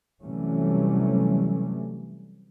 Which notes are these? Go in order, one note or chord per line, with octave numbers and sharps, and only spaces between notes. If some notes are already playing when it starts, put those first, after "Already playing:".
C3 E3 F#3 G3 A3 C#4